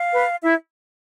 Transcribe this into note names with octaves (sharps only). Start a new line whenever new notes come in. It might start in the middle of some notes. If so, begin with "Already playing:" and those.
Already playing: F5
B4
E4 E5